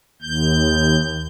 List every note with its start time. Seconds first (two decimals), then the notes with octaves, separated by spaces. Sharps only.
0.22 D#2 G6